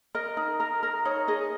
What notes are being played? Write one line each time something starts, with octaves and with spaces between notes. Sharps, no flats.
A#4 D#5
D#4
A#4
A#4
D#4 C#5
G#4 D#5